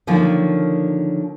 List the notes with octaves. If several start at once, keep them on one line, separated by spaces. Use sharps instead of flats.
D3 D#3 F3 F#3 A#3